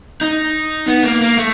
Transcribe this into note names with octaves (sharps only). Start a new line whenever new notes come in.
D#4
B3
A#3
A#3
A3